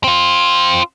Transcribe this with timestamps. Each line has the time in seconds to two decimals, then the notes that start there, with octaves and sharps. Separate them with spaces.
0.04 C4 F4